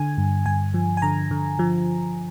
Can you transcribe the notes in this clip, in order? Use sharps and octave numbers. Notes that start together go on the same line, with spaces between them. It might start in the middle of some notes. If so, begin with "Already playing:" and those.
Already playing: D3 G#5
G2
G2 G#5
F3
G#5
D3 A#5
D3
F3